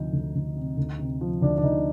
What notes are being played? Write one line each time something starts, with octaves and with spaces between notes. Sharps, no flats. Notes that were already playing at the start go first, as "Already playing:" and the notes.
Already playing: D2 C3 F3 D#4
D2
D2
C3
D2
C3
F3
D2 D4
D4
D2 D#4